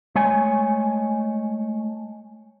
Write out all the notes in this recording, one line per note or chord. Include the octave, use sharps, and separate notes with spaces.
G#3 A3 C#5 G#5